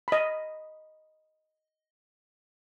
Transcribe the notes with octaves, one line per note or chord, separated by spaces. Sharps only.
D#5 B5